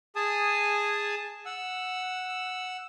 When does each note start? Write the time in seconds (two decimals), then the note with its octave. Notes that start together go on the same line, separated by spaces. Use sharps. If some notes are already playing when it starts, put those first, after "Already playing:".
0.16 G#4 G#5 A5 D#6
1.46 F#5 E6